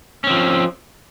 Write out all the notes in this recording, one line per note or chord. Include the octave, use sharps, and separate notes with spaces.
F3 C4 C#4